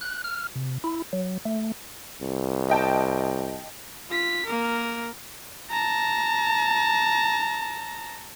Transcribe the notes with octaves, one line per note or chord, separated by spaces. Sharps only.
F#6
F6
C3
E4
F#3
A3
C2
D#5 G5 A5
F4 B6
A#3 A#4
A5 A#5